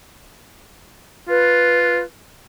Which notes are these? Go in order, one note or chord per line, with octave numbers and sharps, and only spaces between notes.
F4 B4